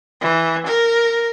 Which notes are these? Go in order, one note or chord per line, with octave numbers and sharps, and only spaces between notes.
E3
A#4